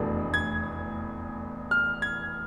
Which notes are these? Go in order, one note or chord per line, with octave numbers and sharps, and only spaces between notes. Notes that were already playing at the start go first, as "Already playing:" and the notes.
Already playing: F1 E2 B2 A3 D4
G#6
F6
G#6